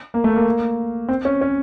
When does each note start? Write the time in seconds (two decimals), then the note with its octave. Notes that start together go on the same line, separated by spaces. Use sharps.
0.14 A#3
0.24 A3
0.36 A#3
1.09 C4
1.25 C#4
1.41 C#4